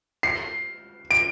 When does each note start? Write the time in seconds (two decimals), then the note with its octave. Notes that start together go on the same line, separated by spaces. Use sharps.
0.23 C7
1.11 D7